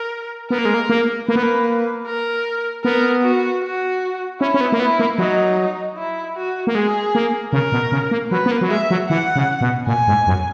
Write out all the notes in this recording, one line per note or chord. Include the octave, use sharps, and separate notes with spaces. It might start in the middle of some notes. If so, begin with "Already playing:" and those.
Already playing: A#4
B3 A#4
A#3
G#3
A#3
A#3
A#3 B4
B3
A#3
A#4
B3 A#4
F#4
F#4
C#4 E4
C#4
B3
A#3
B3 E4
A#3
F#3 D#4
E4
F#4
A#3
G#3 G#4
A#3
C#3 A#4
B2
C#3
A#3
F#3 B4
B3
A#3
F#3
G#3 E5
F#3
E3 F#5
C#3
B2
A#2 G#5
G#2
F#2